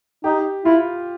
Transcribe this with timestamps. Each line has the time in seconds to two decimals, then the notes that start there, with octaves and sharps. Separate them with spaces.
0.24 D#4 G4
0.65 E4 F4